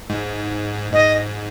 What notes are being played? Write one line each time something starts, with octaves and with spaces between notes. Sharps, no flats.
G#2
G#2 D#5